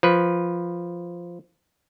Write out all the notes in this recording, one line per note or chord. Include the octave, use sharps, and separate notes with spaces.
F3 B4